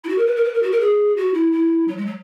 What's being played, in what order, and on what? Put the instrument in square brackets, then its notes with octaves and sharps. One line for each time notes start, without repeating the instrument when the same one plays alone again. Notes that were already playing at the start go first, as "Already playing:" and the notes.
[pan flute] E4
F#4
A#4
B4
A#4
B4
A#4
F#4
A#4
G#4
F#4
E4
E4
F#3
G#3
F#3